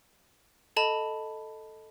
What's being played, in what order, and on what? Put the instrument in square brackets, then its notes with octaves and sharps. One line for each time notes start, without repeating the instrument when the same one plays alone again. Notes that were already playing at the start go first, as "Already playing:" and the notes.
[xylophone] A4 D#5 A5 B5 F7